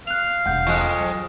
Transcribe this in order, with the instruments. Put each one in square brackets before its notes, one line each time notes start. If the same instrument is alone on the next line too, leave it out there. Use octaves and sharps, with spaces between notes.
[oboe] F5 [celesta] F#6 F7
[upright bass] E1 G2 [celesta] F#5 G6
[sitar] F2 G#3 [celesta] C#6 F#6
[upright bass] E3 F#3